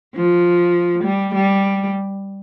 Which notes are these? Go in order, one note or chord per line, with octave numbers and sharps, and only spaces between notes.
F3
G3
G3